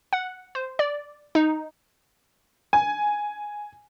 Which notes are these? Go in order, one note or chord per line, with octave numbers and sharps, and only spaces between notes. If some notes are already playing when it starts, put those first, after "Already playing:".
F#5
C5
D5
D#4
G#5